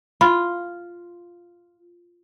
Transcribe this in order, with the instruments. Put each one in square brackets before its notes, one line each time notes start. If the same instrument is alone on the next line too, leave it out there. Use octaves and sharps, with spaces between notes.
[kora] F4 [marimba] B5